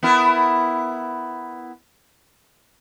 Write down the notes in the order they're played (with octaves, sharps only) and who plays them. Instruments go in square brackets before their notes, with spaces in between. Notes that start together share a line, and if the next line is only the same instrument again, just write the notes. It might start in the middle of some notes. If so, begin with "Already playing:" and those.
[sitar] B3 E4 A#4